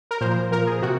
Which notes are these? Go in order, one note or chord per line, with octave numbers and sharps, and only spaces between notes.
A#4
A#2 F3 C5
A#2 F3 A#4
G#4
C3 F#4